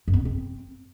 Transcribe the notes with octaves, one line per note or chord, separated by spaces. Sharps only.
F#2
B3
B2
C4